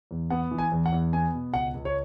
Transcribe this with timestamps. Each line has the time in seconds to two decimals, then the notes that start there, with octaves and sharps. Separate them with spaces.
0.11 E2
0.30 B3 F#5
0.51 E3
0.58 G#5
0.72 E2
0.86 F#5
0.93 E2
1.13 B3 G#5
1.34 B2
1.54 C#2 F#5
1.74 C#2
1.85 C#5